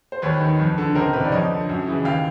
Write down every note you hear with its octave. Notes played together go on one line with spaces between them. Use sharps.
C5
D#2 B4 C#5
D#3
F2
D3
C#2 A#4 C5
C3 D#3 B4
D5
F2 C#5 D#5
D3
F#2
C#3 E3
D#2 F5 G5